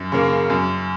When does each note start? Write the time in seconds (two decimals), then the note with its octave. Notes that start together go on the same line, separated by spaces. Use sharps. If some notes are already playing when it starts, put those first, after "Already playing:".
Already playing: F#2
0.12 C#3 A#3
0.50 F#2